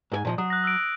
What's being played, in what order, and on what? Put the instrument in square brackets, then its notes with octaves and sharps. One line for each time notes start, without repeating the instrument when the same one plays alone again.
[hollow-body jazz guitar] G#2 A4 G#5
A#2 F3 D#5
[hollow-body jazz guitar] F#3 [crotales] D#6
[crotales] F#6 A#6
E6 D7